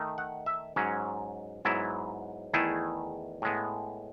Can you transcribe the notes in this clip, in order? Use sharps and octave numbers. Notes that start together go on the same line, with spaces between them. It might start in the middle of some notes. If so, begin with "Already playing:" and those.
Already playing: D#3 A3 D#4
F#5
E5
G#2 F#3 C#4
G#2 F#3 B3 E4
E2 D#3 A3 E4 G#4
A2 G#3 B3